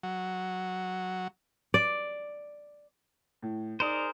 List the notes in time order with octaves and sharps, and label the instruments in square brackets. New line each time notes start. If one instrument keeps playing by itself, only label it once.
[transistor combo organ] F#3
[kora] D5
[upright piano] A2
[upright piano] D#4 D5 D#6 [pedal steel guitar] G#4 A#4 C5